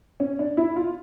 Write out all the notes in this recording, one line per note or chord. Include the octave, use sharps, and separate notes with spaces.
C#4
D4
E4
F4